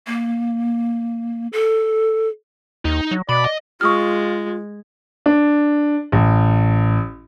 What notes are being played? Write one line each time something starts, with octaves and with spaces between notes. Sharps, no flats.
A#3
A4
D#2 D#4
F#3
B2 D5 B5
D#5
G#3 F4 C#6 D#6 F6
D4
A1